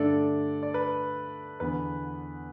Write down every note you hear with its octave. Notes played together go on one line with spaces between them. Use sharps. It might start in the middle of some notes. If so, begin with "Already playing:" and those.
Already playing: G2 D3 A3 D4 A4 D5
D5
B4
E2 D3 B3 B4